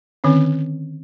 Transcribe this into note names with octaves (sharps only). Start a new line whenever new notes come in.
D3 D#3 C4 C#4